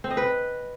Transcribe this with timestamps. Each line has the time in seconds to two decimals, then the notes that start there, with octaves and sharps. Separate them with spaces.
0.04 C4
0.11 D#5
0.17 B4